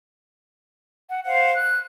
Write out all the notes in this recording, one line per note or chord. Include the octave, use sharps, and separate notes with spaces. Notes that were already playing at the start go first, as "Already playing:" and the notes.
F#5
C5 F5 F#5
F#6